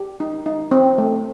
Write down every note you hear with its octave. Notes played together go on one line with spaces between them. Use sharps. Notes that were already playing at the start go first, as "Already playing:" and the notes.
Already playing: G4
D#4
D#4
C4
A3